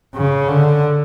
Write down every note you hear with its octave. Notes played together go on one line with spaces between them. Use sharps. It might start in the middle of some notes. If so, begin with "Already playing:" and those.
C#3
D3